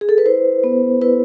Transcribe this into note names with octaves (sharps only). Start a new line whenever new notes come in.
G#4
A4
B4
E4 C5
B3
E4 B4